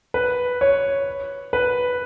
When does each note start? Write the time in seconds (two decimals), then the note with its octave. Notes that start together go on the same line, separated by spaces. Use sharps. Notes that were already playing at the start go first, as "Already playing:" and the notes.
0.14 B4
0.61 C#5
1.53 B4